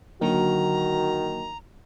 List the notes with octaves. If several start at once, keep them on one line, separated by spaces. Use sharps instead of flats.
D3 D#3 F#3 A#3 F#4 A#5